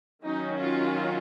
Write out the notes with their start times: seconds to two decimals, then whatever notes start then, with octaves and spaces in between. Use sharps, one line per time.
0.25 D#3 F#3 C#4 D#4
0.60 F4